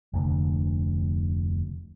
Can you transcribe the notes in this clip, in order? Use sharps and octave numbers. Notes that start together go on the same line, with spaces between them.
F1 D2